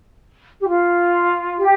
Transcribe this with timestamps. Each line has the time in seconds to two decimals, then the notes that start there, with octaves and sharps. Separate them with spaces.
0.61 G4
0.68 F4
1.59 G4